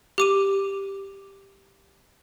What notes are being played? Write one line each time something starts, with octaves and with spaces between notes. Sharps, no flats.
G4 D6 D#7